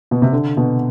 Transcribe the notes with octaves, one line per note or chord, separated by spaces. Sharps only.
B2
C3
D3
B2